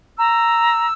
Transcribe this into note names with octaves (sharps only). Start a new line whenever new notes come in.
A#5 E6